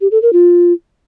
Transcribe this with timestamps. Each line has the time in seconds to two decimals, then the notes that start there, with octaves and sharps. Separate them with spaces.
0.01 G4
0.11 A4
0.22 A#4
0.33 F4